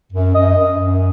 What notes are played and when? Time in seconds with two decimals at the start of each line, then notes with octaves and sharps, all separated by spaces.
0.13 F#2
0.34 F#2 D#5
0.56 F#2
0.78 F#2